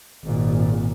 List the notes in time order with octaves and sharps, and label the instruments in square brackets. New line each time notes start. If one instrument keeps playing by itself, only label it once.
[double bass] G#1 A#2